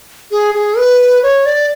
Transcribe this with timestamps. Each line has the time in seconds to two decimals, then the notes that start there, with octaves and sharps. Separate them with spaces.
0.31 G#4
0.54 G#4
0.78 B4
1.23 C#5
1.46 D5